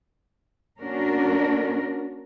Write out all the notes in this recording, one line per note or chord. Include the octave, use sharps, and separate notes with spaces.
A#3 C#4 D4 F#4 A#4